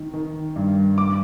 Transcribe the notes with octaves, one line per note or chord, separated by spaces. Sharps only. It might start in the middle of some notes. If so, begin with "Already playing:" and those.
Already playing: D#3
D#3
G2
G2 D6